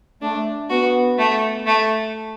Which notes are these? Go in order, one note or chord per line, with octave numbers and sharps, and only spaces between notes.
A3 D4
B3 F#4
A3
A3